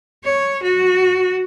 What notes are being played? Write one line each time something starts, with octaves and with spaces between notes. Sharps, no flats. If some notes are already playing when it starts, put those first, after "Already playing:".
C#5
F#4